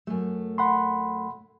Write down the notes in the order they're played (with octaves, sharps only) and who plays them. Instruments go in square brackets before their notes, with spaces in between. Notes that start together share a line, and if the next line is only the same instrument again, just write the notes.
[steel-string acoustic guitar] F#2 A3
[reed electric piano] F#5 B5 C6